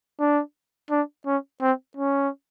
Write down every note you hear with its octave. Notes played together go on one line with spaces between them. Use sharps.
D4
D4
C#4
C4
C#4